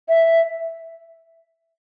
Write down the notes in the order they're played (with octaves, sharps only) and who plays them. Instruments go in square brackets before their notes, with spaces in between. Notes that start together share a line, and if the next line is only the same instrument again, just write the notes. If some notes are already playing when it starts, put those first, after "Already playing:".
[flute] E5